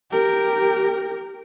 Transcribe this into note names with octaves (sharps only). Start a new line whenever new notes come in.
G4 A#4